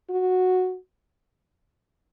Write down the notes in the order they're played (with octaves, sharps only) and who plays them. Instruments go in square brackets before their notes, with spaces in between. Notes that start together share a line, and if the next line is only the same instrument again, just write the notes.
[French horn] F#4